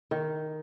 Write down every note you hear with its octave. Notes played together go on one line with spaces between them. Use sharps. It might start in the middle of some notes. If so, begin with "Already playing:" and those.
D#3